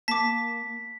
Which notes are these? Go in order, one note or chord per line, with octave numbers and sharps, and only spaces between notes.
A#3 A5 D6 B6